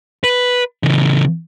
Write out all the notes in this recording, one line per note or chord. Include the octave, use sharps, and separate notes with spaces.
B4
C#3 E3